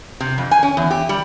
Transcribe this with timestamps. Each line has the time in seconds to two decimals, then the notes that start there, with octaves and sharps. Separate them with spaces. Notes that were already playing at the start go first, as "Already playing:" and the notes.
0.20 C3
0.38 F2
0.51 G#5
0.63 C#4
0.77 E2
0.91 G4
1.09 G3